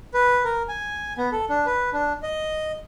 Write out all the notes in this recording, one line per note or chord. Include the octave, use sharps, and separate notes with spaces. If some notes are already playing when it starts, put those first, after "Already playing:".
B4
A#4
G#5
B3
A4
D4
B4
D4
D#5